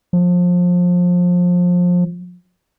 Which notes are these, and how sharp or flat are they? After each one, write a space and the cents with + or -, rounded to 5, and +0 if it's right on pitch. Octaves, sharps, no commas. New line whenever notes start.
F3 +25